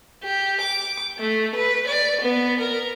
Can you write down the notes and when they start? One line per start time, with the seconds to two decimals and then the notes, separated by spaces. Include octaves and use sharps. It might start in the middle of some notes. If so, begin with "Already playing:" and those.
0.24 G4
0.60 D6
1.18 A3
1.55 B4
1.87 D5
2.21 B3
2.60 A#4